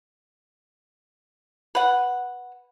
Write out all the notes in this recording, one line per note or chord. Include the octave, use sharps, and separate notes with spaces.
B4 F#5